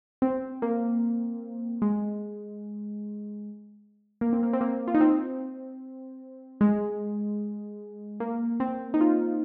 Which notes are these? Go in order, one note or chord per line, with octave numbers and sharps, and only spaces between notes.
C4
A#3
G#3
A#3
C4
A#3
C4
A#3
F4
D#4
C4
G#3
A#3
C4
D#4
F4